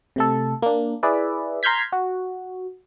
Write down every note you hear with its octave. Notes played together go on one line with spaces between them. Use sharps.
C3 A3 A4
A#3 D4
E4 G#4 B4 D5 E5
A#5 C6 F6 G6 G#6 B6
F#4